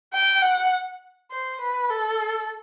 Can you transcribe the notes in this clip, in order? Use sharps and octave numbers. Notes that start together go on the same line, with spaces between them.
G5
F#5
C5
B4
A4